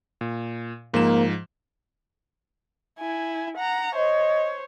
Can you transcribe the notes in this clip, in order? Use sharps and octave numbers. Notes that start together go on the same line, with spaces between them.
A#2
G#2 F3 A#3 E7
E4 G#5
F#5 A#5
C5 C#5 D#5